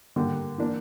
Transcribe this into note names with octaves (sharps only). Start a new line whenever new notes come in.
D3 G3 A#3
E3 A#3 D4